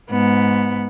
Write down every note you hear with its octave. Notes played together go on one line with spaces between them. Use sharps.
G#2 B3